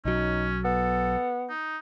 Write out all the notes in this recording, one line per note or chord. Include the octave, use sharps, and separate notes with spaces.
B1 F#3 C#4 D#4
B3 A4
D#4